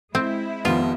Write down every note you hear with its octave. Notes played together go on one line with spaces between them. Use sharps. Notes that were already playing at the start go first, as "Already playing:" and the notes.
G#3 C4 E4 G6
F1 D#3 F3 B3 F4